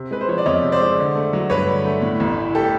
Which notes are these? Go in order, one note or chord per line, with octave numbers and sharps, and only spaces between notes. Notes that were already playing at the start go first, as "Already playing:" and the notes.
Already playing: C3
G#3 B4
C5
F3 C#5
D5
F2 C#5 D#5
C3
C5 D5
G#3
D3
A3
F#3
G2 B4 C#5
D3
A3
A2
A1
E3
G4 A4